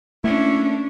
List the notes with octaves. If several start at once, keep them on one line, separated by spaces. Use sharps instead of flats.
A3 A#3 C#4 D4 E4